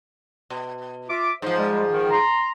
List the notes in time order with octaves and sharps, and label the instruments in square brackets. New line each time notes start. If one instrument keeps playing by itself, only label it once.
[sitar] B2
[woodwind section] F4 E5 D6
[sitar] G#2 F3 [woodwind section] C5
[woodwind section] G3 G#3
D#3
A#5 C6